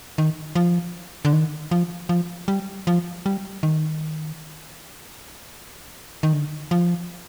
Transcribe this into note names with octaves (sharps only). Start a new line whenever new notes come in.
D#3
F3
D3
D#3
F3
F3
G3
F3
G3
D#3
D#3
D3
F3